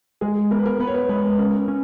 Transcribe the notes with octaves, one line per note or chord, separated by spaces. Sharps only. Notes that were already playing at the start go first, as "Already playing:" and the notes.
G#3 G#4
B3 A#4
B4
A#4
B3 B4
C#5
B4
G#3 B4
C#4 A#4
C#4